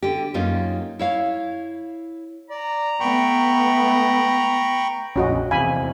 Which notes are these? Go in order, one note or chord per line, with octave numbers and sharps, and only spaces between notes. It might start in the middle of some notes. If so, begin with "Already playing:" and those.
D3 G4
F#2 A#3 C#4 D#4 F4
E4 C#5 F5
D5 A#5
A3 B3 G5 B5 C#6
A#1 F2 C#4 F#4 D#5
E2 C3 F5 G#5 B5